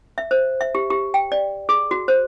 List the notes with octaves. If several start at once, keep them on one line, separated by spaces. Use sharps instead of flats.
E5
C5
E5
G4
G4
G5
D5
G#4
F#4
C5